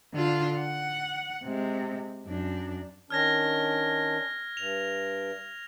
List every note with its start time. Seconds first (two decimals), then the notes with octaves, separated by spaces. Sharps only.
0.14 D3 F4
0.59 F#5
1.44 C3 G#3
2.27 F#2 D4
3.10 D#3 C#4 D4 F6 G#6 A#6
4.57 G2 F7